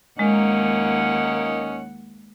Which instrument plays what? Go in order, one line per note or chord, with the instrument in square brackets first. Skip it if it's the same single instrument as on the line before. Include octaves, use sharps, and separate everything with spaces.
[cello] D#2 F#5 [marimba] G#3 [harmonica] A#3 C#4 D#4